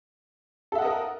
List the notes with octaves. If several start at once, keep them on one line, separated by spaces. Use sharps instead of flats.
A4 A#4 D#5 E5 F#5